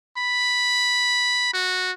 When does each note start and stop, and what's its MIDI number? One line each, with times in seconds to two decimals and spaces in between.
0.18 1.49 83
1.53 1.92 66